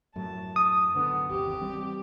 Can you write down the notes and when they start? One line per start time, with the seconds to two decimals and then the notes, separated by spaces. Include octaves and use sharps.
0.16 F#2 A2 F#3 A5
0.56 D#6
0.95 A1 F#2 D3 B3
1.30 G#1 E2 C3 G4
1.61 E3 G3 C4